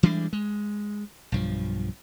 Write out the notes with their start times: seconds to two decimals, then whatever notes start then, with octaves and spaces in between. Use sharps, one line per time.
0.03 E3 G3 G#3 D4
0.33 G#3
1.32 B1 G2 F3